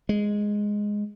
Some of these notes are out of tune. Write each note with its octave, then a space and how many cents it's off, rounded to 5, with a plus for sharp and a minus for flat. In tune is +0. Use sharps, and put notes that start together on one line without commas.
G#3 -5